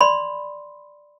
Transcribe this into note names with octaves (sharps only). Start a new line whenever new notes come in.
D5 B5 C6